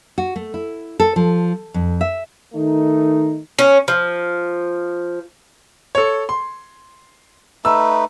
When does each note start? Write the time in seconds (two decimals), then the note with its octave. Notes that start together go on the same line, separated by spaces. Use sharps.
0.18 F#4
0.36 A3
0.54 E4
1.00 A4
1.16 F3
1.74 F2
2.01 E5
2.55 D#3 A3 D#4
3.59 C#4
3.88 F3
5.95 A4 C#5
6.29 C6
7.65 A3 D#4 B4 E6